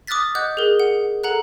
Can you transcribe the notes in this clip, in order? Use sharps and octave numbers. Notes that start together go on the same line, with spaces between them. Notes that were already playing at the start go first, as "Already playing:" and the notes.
D6 D#6 F6 F#6 A6 B6
D#5 F#5 D6 F#6 G6
G#4 A#4
F#5
A4 F#5 A#5 F#6